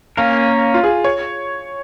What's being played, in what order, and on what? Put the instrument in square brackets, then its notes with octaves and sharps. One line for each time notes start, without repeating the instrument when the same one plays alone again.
[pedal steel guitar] A#3 C#4 A#4 [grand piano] F5
[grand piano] F4
G#4
C#5